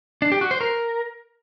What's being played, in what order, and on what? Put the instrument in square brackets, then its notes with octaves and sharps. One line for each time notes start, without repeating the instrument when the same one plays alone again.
[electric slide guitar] D4
G4
F#4
C5
A#4